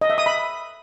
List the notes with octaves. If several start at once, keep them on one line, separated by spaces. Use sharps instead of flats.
D#5
E5
D#6
B5